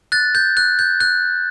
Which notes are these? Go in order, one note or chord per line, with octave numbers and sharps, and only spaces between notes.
F#6 A6
G6
F#6
G6
F#6